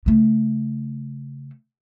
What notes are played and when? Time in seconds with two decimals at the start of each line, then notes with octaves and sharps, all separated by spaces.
0.06 C#3 A3